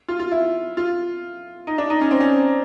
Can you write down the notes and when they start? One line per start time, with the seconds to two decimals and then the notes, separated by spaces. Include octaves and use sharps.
0.09 F4
0.19 F4
0.31 E4
0.77 F4
1.67 D#4
1.78 D4
1.90 D#4
2.01 C#4
2.11 C4
2.20 C#4